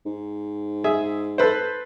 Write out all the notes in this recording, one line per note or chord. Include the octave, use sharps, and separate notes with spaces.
G#2
G#4 E5
A4 B4 C5